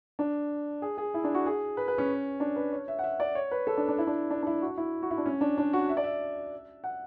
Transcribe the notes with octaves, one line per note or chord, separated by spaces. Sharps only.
D4
G#4
G#4
E4
D4
F#4
G#4
B4
B4
C#4
D4
B4
C#5
E5
F#5
E5
D5
C#5
B4
A4
D4
D4
E4
D4
D4
D4
E4
F#4
E4
F#4
E4
D4
C#4
D4
D4
F#4
E5
D5
E5
F#5